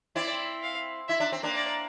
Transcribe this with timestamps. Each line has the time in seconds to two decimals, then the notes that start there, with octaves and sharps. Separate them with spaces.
0.16 C4 E4 D5
0.63 F5
1.08 E4 E5
1.20 D4
1.32 C4
1.43 A#3 D4
1.55 D5